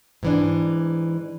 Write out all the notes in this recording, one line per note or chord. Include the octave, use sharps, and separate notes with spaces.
G#2 E3 D4